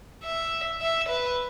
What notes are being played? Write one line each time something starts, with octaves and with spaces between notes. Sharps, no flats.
E5
E5
B4